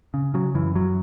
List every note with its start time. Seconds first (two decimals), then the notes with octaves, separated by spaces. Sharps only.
0.14 C#3
0.34 C#3 F#3
0.55 F#2 E3
0.75 F#2 F#3